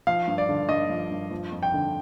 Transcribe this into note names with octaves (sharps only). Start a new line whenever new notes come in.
F3 F5
G2
D5
D3
G2 D#5
F3
G2
F3
F2
G5
D3